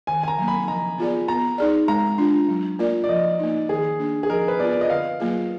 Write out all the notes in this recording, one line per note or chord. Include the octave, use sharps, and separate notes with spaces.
D#3 G#5
G#5
A#5
F#3 A#3
B5
F3 A#5
B3 F4 G#4 D5
B3 A#5
D#4 G#4 D5
G#3 A#5
D4 F4
F#3
A#3 F4 A#4 D5
D5
F3 D#5
A#3 D#4
D#3 G#4
A#3 D4
G#4
F3 A#4
B4
B3 F4 D5
D5
D#5
D3 F5
F#3 A#3 F4 G#4